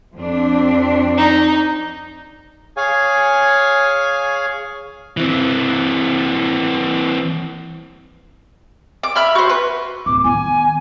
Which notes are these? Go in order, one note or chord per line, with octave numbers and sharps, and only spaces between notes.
F2 C4 D4
D#4
G#4 C#5 F5 G#5
E3 C4
D6
E5 B5 F6
F#4 C5
B4
D1 D6
D#3 B3 G#5